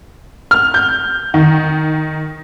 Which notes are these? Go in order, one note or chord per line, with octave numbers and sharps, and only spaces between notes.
F6
G6
D#3